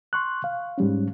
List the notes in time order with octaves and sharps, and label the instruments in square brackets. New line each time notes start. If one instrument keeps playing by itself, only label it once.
[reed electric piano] C6 C#6 F#6
F5
G#2 G3 C#4